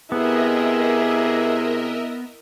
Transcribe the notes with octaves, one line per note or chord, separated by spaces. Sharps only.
C3 B3 E4 G#4 A#4 D#5 E5